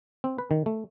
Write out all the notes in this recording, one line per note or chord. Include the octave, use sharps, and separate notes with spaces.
C4
B4
D#3
A3